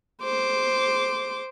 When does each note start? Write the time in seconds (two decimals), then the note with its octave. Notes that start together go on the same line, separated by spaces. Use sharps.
0.22 C5 D6